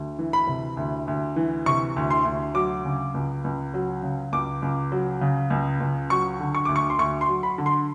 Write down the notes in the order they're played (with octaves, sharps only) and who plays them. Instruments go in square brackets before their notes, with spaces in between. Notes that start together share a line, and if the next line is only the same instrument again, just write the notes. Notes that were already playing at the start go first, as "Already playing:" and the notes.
Already playing: [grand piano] D2
E3
B5
C3
D2
D2
E3
C3 C#6
D2
C6
D2
F#3 D6
C#3
C#2
C#2
F#3
C#3
C#2 D6
C#2
F#3
C#3
C#2
C#2
F#3 C#6
D3
C#6
D2 D6
C#6
C6
D2 C#6
C6
F#3
B5
D3
C6